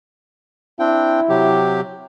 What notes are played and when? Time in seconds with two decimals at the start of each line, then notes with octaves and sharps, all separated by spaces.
0.80 C4 D4 E4 G5
1.29 C3 F#3 G4